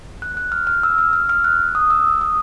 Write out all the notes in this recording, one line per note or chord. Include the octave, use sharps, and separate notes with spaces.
F#6
F#6
F6
F6
E6
F6
F6
F6
F#6
D#6
E6
D#6